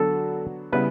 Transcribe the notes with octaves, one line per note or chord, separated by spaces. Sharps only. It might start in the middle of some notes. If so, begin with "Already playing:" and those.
Already playing: D3 F#3 B3 D4 F#4 A4
C#3 G3 B3 E4 B4